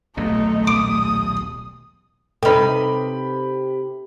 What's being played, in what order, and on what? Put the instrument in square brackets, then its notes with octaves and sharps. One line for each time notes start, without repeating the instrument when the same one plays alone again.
[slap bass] D#1 B1 A#2 [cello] A3 [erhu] D#4
[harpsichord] D6 [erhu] D#6
[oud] C3 D#4 [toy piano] A4 B4 [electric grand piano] G5 B5